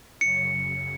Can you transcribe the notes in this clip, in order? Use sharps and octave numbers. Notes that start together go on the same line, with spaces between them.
F#2 C#3 F#3 C#7